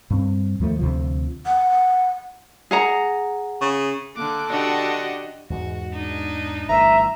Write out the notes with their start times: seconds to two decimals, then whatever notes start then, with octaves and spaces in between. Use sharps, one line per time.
0.10 G2 C4
0.60 D#2 F3 A3
0.79 D2 C3 F3
1.46 F#5
2.71 G#4 F#5 A#5
3.62 C#3
4.16 D3 A#3 A4 D6 F#6
4.50 D3 D4 F#4 G4 D#5 F#5
5.50 E2 G#2 G#3 F#4
5.94 D4 D#4
6.69 G1 E3 A3 E5 A#5